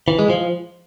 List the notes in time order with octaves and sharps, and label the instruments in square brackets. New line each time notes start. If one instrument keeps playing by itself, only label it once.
[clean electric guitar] E3
G#3
F3